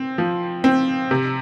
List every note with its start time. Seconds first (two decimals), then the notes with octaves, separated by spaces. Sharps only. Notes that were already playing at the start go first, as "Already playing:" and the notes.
Already playing: C4
0.18 F3
0.64 C4
1.11 C3